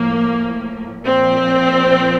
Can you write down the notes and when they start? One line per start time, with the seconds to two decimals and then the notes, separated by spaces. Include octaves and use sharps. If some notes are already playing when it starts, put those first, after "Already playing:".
Already playing: A2 F3 A#3
1.04 A#2 F3 C4